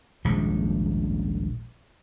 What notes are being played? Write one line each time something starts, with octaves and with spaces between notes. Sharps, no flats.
D#1 A#1 G#2 G#3